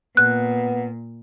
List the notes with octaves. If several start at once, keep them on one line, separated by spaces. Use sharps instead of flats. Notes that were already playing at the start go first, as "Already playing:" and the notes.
A#2 B3 F#6